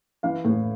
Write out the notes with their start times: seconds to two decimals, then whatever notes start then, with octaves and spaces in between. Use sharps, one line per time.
0.23 E3 F5
0.45 A2